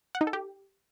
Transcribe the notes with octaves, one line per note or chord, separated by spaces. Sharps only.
F#5
D#4
A4
G4